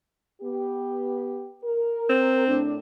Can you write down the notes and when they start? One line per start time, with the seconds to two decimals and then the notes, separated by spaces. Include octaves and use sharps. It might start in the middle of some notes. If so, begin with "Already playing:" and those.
0.42 B3 G4
1.64 A#4
2.10 C4
2.48 A2 D4